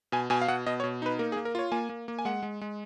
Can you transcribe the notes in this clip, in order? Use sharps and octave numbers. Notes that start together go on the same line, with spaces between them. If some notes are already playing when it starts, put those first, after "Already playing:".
B2 G#5
B2 G#5
F5
B2 F#5
B2 D#5
C#5
B2
D#4 B4
A#3 A#4
G#4
A#3
A#4
F4 C#5
A#3 G#5
A#3
A#3
G#5
G#3 F#5
G#3
G#3